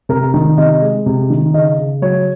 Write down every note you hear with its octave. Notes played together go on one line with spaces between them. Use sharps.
C3 A#4
D#3
C3 D#5
G#3
C3
D#3
C#3 D#5
C#3
F#3 C#5